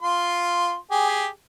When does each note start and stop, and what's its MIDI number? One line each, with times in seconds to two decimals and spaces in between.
0.02 0.75 65
0.02 0.75 84
0.91 1.27 67
0.91 1.27 68